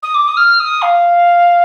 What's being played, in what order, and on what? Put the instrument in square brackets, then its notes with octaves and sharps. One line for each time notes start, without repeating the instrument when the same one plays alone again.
[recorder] D#6
D6
D#6
F6
D#6
F5